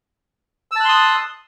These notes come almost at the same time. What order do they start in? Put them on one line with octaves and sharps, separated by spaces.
E6 A5 F#6 C6 D#6